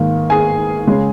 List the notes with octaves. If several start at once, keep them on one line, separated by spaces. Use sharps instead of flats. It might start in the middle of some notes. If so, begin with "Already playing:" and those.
Already playing: G#2 D#3 A#3
G#4 G#5
C#3 G#3